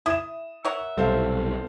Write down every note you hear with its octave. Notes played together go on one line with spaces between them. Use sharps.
E4 D#6 E7
A#4 C#5 E5 F#5
B1 C3 G3 A4 C5 F5